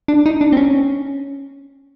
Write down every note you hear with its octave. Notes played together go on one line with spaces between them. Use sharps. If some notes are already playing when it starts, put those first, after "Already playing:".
D4
D#4
D4
C4
C#4